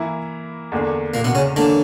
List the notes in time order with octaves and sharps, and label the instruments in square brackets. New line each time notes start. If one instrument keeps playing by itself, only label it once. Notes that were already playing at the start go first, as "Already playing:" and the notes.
Already playing: [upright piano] E3 A#3 E4 A#4 E5
E2 D3 A#3 D4
[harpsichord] A#2 A#3
B2 B3
C#3 C#4
[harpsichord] D3 D4 [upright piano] E3 A#3 C#4